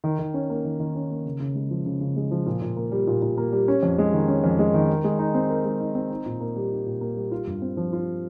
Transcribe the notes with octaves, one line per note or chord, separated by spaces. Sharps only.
D#3
D#3
C#4
A#3
D#3
D#3
C#4
A#3
C#3
C#3
G#3
F3
C#3
C#3
G#3
F3
A#2
A#2
A#3
G3
A#2
A#2
A#3
G3
C#4
F2
G#3
D#3
C#4
F2
G#3
D#3
A#4
G#3
D#4
C4
A#4
G#3
D#4
C4
D#4
A#2
A#3
G3
D#4
A#2
A#3
G3
F4
G2
C4
F3
F4